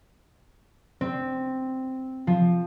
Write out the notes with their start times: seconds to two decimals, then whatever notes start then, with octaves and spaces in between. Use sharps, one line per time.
1.01 C4
2.27 F3